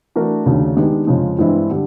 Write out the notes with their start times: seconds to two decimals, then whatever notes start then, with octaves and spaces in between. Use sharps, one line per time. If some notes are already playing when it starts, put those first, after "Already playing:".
0.16 E3 A3 D4 F#4 A#4
0.46 D#2 C#3 F#3 A3 D4
0.77 D#3 G#3 B3 D4 G4
1.07 F2 C#3 F3 G#3
1.39 G2 E3 G#3 C4 E4
1.70 D3 G3